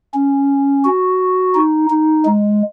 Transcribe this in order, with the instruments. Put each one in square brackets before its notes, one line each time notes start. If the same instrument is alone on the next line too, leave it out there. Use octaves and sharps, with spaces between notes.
[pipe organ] C#4
F#4
D#4
D#4
G#3